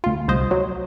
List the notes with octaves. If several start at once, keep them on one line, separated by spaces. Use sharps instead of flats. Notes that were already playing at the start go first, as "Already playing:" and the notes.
D2 F4
C2 C5 D#5
F#3